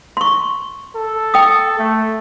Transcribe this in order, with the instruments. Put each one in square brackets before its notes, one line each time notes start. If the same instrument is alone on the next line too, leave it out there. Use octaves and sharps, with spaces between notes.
[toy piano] C6 C#6
[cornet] A4
[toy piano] G5 D#6
[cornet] A3